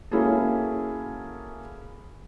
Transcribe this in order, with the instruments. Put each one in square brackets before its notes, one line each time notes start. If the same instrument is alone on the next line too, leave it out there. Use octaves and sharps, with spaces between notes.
[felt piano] A#3 C#4 E4 F#4 G#4 A4